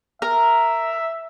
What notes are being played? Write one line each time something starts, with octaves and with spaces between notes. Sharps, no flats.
A#4 E5